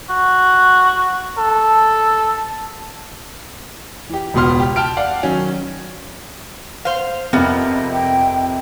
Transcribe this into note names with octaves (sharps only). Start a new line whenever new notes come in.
F#4
A4
E3 G4
E1 C#2 B2 B3 C6 F6
G4
G5 A5 F6 D7
D5 F5 F#5
D#3 F#3 C#4
C5 F5
F2 C3 G3 A#3 B3
G5